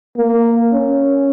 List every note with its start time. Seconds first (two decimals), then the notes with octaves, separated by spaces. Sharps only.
0.16 A#3
0.73 C#4